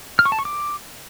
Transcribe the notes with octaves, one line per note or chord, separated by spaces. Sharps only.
F6
C#6
A5
C#6
D6